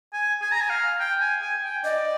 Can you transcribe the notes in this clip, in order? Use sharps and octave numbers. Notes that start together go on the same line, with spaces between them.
G#5
G#5
A#5
G#5
F5
G5
G#5
G#5
G5
D5 D#5